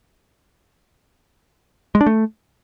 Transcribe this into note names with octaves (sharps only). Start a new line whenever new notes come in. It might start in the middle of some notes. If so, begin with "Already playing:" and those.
G#3
D4
A3